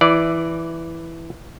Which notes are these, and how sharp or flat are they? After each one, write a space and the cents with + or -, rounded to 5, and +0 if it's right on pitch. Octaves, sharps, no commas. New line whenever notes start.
E3 +0 D5 -5